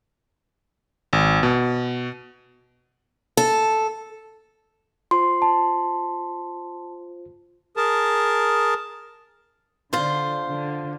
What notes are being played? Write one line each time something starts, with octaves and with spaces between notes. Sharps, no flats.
G#1
B2
A4
F4 C5 C6
A5
G#4 A#4 A5
D3 F4 C5
D3